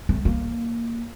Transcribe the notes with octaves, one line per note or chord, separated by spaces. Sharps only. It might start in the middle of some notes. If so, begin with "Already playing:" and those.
A3
A#3